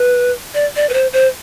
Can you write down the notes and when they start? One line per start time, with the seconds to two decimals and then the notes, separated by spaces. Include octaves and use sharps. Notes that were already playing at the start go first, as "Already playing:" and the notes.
Already playing: B4
0.54 D5
0.76 D5
0.89 B4
0.94 C5
1.13 C5